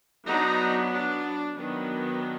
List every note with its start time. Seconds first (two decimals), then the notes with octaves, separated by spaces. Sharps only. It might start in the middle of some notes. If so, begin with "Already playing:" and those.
0.26 F#3 B3 D4 D#4
0.92 D4
1.57 D#3 F#3 B3 D4